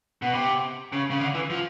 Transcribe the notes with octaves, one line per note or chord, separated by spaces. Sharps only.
B2
C3
C#3
C#3
D3
E3
F3